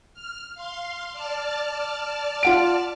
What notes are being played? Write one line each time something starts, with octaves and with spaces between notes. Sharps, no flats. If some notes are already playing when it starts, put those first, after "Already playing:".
F6
F5 C6
D5 A5 F6
F4 F#5 D7